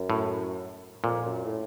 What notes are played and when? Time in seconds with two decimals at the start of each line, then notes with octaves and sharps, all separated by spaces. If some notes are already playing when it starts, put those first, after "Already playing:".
Already playing: F#2
0.10 A2
1.04 F2 A#2
1.25 F#2
1.45 A2